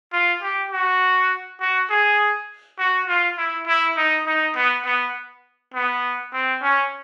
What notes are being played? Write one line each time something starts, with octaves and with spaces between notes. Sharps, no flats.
F4
G4
F#4
F#4
G#4
F#4
F4
E4
E4
D#4
D#4
B3
B3
B3
C4
C#4